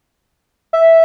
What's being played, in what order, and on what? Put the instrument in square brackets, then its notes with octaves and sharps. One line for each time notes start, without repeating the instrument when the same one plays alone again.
[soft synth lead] E5